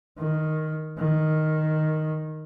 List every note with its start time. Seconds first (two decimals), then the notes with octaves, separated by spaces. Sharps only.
0.18 D#3
0.98 D#3